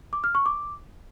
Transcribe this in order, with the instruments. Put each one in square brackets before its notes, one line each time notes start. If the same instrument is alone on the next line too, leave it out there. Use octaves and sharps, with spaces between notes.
[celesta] D6
F6
C#6
D6